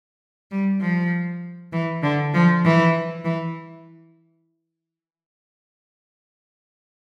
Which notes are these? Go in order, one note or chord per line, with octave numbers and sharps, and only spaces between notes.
G3
F3
E3
D3
F3
E3
E3